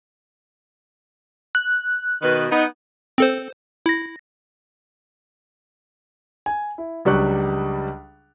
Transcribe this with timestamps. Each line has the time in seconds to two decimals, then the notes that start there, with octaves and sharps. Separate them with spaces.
1.55 F#6
2.23 B2 D#3 B4
2.50 B3 D#4
3.18 C4 A4 C5
3.86 E4 A#6
6.46 G#5
6.78 E4
7.05 C#2 F#3 G3 D4 C#6 F#6